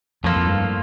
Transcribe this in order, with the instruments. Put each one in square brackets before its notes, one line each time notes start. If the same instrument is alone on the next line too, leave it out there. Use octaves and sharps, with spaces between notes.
[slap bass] F2 [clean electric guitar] A2 F3 A#3 F4 A4
[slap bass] F2
G2